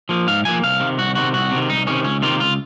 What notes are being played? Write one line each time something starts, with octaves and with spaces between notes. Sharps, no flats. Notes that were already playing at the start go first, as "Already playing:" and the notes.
F3 A#3
G#2 F5
F3 A#3 G#5
C2 F5
C3 D#3
C2 F#4
C3 D#3 F#4
C2 F#4
C3 D#3
C2 D#4
C3 D#3 C#4
C#2 C#4
C3 D#3 A#3 F4
C#2 F4